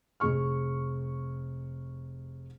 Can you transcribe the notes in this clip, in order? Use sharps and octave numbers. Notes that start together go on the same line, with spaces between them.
F1 G#4 C#6 F6